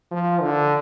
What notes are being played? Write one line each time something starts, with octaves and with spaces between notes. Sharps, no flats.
F3
D3